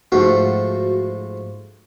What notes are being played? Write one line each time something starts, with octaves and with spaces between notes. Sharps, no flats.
G#2 F3 A3 F#4